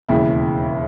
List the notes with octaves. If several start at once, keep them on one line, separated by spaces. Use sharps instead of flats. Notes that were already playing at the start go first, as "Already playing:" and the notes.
E1 D#2 C#3 E3 E4